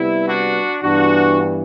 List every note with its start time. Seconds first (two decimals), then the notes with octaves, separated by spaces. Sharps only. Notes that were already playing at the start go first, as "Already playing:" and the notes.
Already playing: C3 G3 B3 E4
0.28 D4 F#4
0.82 G2 E3 B3 D4 F#4